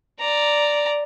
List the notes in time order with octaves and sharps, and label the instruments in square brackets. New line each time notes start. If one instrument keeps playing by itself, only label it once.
[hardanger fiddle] D5 A#5